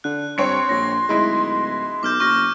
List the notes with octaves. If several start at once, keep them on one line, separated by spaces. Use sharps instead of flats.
D3 F#6
G2 C4 C#5 C6 C#7
A#1 A#6
D1 G#3 D#4 E4
B1 D6 F6 G6
F#1 C#6 F6 A#6